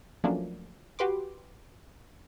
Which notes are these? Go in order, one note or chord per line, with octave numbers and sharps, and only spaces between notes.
F3 F#3 A3 A#3 C#4 D4
F#4 G4 B4 C6 D6